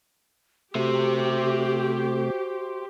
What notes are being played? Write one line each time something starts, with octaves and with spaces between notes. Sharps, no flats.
C3 A3 F#4 G4 C5 E5